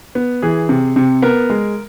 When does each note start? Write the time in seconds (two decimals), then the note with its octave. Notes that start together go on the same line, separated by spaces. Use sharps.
0.15 B3
0.42 E3 G#4
0.69 C3
0.96 C3
1.22 B3 A#4
1.50 G#3